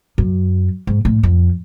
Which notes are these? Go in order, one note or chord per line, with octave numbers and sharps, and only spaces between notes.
F#2
G#2
A2
F2